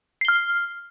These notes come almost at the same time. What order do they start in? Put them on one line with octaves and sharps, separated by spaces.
C7 G7 F6